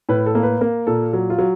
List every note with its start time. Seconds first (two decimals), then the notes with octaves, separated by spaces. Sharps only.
0.09 A2 B4
0.26 A4
0.35 A#3
0.43 B4
0.61 A#3 A#4
0.87 A#2 A4
1.13 F#3
1.30 F4
1.38 F#3